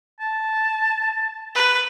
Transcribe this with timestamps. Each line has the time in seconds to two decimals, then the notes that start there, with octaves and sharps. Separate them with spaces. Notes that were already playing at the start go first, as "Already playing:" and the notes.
0.20 A5
1.55 B4